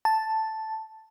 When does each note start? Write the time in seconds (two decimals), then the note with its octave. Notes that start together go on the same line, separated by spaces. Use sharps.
0.05 A5